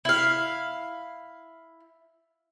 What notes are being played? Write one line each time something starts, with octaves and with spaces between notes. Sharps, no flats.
E4 F5